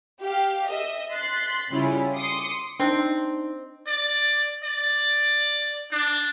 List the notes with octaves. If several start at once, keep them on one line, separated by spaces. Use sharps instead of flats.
G4 F5
D#5 E5
C6 F#6 A6 B6
C#3 G3 C#4 E4 F4
C6 D6 D#6 C#7
C4 D4 D#4
D5
D5
D4